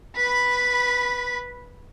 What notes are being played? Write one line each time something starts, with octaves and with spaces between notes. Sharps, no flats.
B4 B5